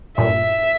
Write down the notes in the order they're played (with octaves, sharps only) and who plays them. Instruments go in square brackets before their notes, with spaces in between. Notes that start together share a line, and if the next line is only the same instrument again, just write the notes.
[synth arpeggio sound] G2 A#2 [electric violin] E5